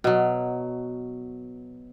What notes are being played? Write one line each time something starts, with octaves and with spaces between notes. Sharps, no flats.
B2 F#3